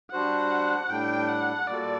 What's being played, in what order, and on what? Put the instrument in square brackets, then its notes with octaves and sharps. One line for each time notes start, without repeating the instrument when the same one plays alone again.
[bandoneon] G3 D4 F#4 C5 [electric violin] F#5
[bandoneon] A2 G3 D4 [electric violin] G5
[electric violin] F#5
[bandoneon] A#2 G3 A#3 F#4 A4 [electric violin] D5